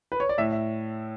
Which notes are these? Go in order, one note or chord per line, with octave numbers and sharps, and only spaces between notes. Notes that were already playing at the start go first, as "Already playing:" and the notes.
B4
C#5
D5
A2 E5
E5